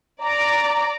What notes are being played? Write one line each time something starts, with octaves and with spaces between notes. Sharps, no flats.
D5 A#5 D6